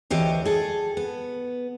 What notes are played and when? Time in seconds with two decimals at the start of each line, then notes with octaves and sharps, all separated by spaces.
0.10 D2 E3 G4 C#5 D#5
0.45 G#4 A4
0.97 B3